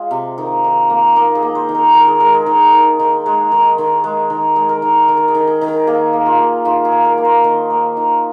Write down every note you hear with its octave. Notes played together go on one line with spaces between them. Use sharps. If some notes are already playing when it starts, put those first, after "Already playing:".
Already playing: G#3 F4
C3
D#3
D#3
A#3
A#3 D#4
G#4
A#3
C5
D#3
A#4
D#3 A#4
G#4
G#3 A#4
G#4
D#3
D#3
D#3
G#3
D#3
D#3
G#3
D#3 A#4
G#3
A#4
D#3
D#3
A#4
G#4
D#3
G#4
D#3
A#4
A#3 G#4
A#3
F4
A#3
D#3 F4
G#4
A#3
A#4
A#3
C5
D#3
A#3
D#3